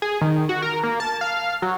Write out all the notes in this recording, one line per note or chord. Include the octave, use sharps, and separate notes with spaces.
G#4
D#3
F#4
A#4
A#3
A5
F5
F#3